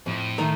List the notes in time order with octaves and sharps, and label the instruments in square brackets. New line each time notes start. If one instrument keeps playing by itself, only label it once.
[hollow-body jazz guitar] F2 [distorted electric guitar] A2
[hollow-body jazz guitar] D#3 A3 D#4 A#4